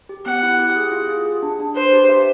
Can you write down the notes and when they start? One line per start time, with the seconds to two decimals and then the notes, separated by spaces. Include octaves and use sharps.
0.09 G4
0.26 B3 F#5
0.43 E4
0.59 G4
0.76 G#4
0.92 F4
1.09 G#4
1.26 G#4
1.43 D4
1.60 D4
1.75 B4 C5
1.93 G4
2.09 E5